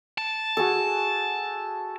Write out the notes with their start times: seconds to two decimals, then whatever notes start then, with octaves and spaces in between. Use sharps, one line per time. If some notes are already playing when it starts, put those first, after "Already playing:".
0.18 A5
0.57 F#4 G#4 A4